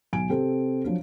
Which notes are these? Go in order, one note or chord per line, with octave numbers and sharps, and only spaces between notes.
B1 G#5 D7
C3 C4 A4
F3 F#3 D4